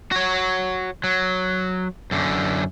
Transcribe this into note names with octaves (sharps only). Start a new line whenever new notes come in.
F#4 C#5
F#3
F#2 D3